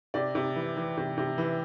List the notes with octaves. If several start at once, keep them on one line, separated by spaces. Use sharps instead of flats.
C3 D5
C3
E3
E3
C3
C3
E3